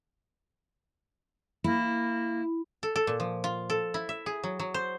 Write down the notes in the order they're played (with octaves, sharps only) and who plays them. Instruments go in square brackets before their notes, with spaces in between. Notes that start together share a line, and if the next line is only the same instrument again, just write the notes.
[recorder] A#3 [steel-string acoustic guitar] E4
[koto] A4
A4
A#2
F3
F4
A4
E4
E5
G#4
F#3
F#3
C5